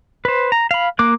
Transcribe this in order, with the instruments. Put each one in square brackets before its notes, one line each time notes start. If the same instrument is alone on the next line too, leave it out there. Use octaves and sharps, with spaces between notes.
[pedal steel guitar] B4 C5
A#5
F5 B5
A#3 D6 F#6